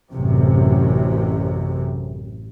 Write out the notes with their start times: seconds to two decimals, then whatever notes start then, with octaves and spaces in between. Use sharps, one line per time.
0.12 A1 F#2 C3